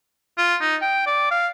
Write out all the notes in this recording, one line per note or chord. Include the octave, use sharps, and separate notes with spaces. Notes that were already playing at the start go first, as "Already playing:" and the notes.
F4
D#4
G5
D5
F5